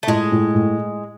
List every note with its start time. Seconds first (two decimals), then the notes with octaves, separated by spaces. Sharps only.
0.03 A3
0.07 A2 G#3
0.32 A2
0.55 A2